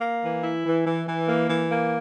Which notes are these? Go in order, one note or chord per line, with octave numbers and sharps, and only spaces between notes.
A#3
E3
E4
E3
E3
E3
A#3
E3
A#3